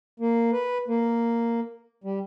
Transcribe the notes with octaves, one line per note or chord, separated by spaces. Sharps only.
A#3
B4
A#3
G3